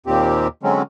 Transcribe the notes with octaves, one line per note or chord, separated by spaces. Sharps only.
D#2 A#2 D#3 C4 G4
D3 F#3 G#3 C4 C#4